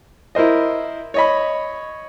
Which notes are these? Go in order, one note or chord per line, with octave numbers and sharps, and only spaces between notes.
E4 A#4 C5 D#5
C#5 D#5 B5